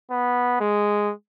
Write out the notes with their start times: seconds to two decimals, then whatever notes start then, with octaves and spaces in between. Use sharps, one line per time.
0.11 B3
0.61 G#3